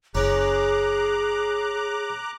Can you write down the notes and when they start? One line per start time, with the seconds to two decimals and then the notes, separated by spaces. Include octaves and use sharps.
0.15 F#1 C#4 G#4 A#5 D6 F#6